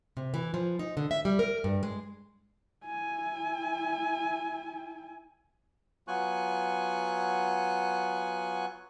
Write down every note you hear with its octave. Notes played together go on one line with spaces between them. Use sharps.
C3
E3
F3
D#4
D3
E5
G3
A#4
G2
G#3
E4 G#5
F#3 B3 F4 G#5 C#6 F#6